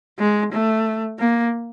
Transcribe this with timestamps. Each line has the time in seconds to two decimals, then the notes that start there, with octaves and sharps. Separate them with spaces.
0.19 G#3
0.53 A3
1.20 A#3